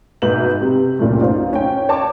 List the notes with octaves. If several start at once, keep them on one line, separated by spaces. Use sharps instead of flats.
G#2 B2 B4 E5 F#7
C3
C#2 A#2 F#3 A3
D#4 F4 C5
C#4 G5
C#5 A5 D6